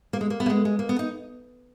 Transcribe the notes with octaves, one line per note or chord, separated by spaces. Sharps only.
A#3
G#3
A#3
B3
A#3
G#3
G#3
A#3
B3
D#4